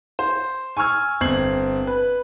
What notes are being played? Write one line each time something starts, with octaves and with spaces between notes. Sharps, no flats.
C5
G#5 C#6 E6 F6 G#6
G1 C4 G#6 C7 F#7
B4